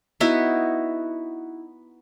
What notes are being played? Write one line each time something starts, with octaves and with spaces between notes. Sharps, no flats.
B3 D#4 E4 F#4